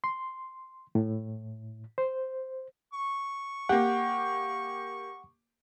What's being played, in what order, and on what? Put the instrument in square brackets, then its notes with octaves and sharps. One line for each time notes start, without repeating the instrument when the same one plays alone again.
[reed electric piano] C6
A2
C5
[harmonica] C#6
[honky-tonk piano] A#3 G4 [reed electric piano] F#5